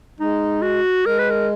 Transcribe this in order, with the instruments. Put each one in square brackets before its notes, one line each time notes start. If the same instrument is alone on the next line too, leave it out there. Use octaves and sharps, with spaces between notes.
[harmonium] G#3 [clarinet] D#4
[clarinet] F#4
[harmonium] G#3 [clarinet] A#4
[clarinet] B4
A#4